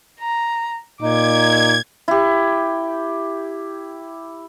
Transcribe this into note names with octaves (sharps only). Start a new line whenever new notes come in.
A#5
A#2 D#4 D6 G#6
E4 G4